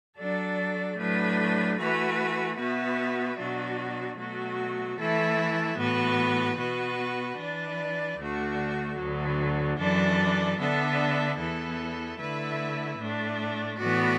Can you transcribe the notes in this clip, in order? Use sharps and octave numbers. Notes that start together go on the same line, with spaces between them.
F#3 D4 A4 D5
A2 F#3 D4 B4
E3 A3 F#4 B4
B2 B3 F#4 B4 E5
B2 F#3 D4 F#4
B2 F#3 A3 F#4
E3 A3 E4 A4 E5
A2 E3 B3 F#4 B4
B2 B3 F#4 B4
E3 D4 B4 D5
D2 D3 A3 D4 F#4
D2 D3 F#3
F#2 E3 D4 A4 D5
D3 B3 D4 A4 E5
E2 E3 B3 E4 A4
D3 A3 E4 B4 E5
A2 A3 D4
A2 E3 B3 F#4 D5